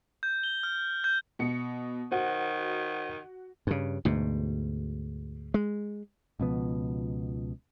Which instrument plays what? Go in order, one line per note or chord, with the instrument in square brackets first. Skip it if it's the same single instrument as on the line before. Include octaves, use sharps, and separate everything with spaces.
[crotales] G6
G7
F6
G6
[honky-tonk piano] B2 C#7
[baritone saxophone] D#3 [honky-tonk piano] F#4 [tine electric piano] C5 F#5
[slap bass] G2 C#3
D2 G#2 B2
G#3
[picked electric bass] C#2 B2 F3 B3